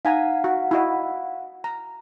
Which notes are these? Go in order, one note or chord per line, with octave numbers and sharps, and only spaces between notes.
D#4 F5 F#5 G#5 A#5
F#4
E4 F#4 D#5
A#5